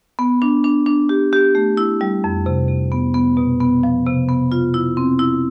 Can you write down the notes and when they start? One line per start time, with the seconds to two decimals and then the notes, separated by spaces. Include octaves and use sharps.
0.19 B3
0.42 D4
0.64 D4
0.86 D4
1.09 G4
1.33 G4
1.55 A3
1.77 E4
2.01 G3
2.24 F2
2.46 C3
2.69 C3
2.92 B3
3.14 B3
3.37 B2
3.60 B3
3.83 F3
4.06 C3
4.29 B3
4.52 F4
4.74 E4
4.97 C4
5.19 E4